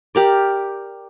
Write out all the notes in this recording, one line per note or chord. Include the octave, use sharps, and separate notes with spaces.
G4 A#4 D5